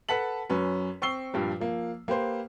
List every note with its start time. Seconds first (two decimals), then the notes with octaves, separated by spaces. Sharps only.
0.09 A4 B4 F#5 A5 B6 F#7
0.50 F#2 C#4 B4
1.02 C4 C#6 E6 C7 G7
1.34 G2 A#2 F3 G3
1.60 F3 A#3
2.08 A#3 G4 B4 C5